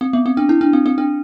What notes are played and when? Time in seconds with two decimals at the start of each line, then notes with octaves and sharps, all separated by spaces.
0.01 C4
0.13 B3
0.26 C4
0.37 D4
0.49 E4
0.61 D4
0.73 C4
0.86 C4
0.98 D4